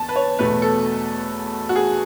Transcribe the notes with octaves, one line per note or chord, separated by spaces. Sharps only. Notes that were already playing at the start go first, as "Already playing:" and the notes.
Already playing: E2 A5
B4
C#5
E2 B2 A3 B4
A4
F#4
G#4